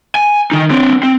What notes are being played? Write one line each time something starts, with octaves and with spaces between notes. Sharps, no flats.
G#5
D#3 D#4
C4 D4
C4